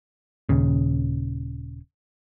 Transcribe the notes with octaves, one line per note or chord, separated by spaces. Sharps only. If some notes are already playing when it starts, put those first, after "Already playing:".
D#1 D#2 C#3